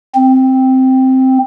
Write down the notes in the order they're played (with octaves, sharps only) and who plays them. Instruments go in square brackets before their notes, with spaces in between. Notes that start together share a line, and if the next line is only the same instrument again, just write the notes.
[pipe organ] C4